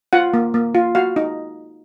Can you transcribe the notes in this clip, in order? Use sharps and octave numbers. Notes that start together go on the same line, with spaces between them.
F4 F#5
A#3
A#3
F4
F#4 F5
D#4